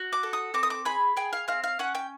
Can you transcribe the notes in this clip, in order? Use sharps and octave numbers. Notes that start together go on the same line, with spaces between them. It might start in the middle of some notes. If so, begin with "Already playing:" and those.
Already playing: F#4
D6
A4
D#6
C4 D6
D#6
D6
G#4 B5
G#4 G5
F5
C4 F5
F5
C#4 F#5
G5